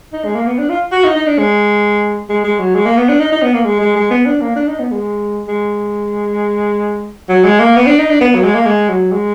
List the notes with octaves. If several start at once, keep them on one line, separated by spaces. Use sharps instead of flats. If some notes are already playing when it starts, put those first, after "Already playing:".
D#4
G#3
A#3
B3
D4
F4
F#4
D#4
D#4
D4
G#3
G#3
G#3
F#3
G#3
A#3
B3
D4
D#4
D#4
B3
A#3
G#3
G#3
G#3
B3
D4
A#3
D4
D#4
B3
G#3
G#3
F#3
G#3
A#3
B3
D4
D#4
D4
B3
F#3
G#3
A#3
G#3
F#3
G#3